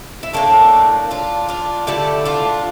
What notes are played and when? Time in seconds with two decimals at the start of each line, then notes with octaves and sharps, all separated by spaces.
0.23 E4
0.33 A2 F3 A3 A#3 D4
1.11 D4 F4
1.49 D4 F4
1.87 D3 A3 E4 G4
2.25 D4 F4